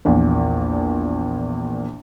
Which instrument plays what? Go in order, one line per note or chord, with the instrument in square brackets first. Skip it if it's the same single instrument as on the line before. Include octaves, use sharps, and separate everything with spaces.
[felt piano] A#1 E2 A#2